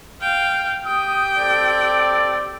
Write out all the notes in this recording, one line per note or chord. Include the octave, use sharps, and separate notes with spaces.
F5 G5
G4 G5 D#6
C4 A4 D5